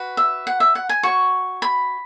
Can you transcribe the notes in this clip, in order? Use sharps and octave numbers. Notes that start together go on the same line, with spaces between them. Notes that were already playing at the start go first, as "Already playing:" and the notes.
Already playing: F#4 B4
E5
F#5
E5
F#5
G#5
F#4 C#5 C#6
B5